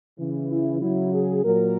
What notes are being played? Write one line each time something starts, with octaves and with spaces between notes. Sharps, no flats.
C#3 E3
E4
C#3 F#3 E4
G#4
A#2 F#3 A#4